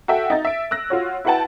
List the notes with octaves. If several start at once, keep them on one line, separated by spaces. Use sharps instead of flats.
F#4 A4 E5 G5
D#4 A6
E5 D7
E6 F#6 A#6
F4 F#4 C#5
E4 F#4 B4 F#5 G5 A5